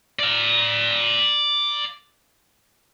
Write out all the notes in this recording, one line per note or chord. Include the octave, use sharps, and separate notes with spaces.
D5 F5